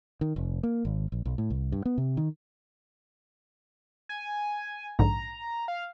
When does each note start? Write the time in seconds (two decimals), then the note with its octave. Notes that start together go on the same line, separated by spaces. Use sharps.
0.21 D#3
0.36 F1
0.63 A#3
0.85 G#1
1.12 A#1
1.25 B1
1.38 A2
1.50 C2
1.72 G2
1.85 B3
1.98 C3
2.17 D#3
4.09 G#5
4.99 A#1 G#2 D3 A#5
5.68 F5